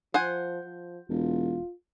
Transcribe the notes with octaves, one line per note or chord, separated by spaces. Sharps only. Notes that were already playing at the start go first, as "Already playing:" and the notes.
F3 C5 F#5 G#5
F3
E1 F4